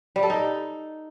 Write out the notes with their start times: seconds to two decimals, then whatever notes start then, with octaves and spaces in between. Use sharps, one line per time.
0.16 G3
0.23 A4
0.30 D#4